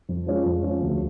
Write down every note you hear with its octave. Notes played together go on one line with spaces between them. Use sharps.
F2
F3 G#3 C#4 F4
F2
F3 G#3 C#4 F4
D2